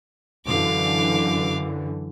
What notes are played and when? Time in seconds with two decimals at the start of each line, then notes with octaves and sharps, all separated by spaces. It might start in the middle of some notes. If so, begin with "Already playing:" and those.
0.46 F#2 D3 E3 F5 D6